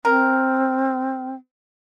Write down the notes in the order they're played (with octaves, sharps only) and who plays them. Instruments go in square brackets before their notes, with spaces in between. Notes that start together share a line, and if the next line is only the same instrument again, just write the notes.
[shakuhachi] C4 [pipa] A#4